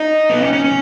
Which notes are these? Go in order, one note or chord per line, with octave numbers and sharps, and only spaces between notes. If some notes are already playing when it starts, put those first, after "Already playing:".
Already playing: D#4
B3
C#4
C#4
C#4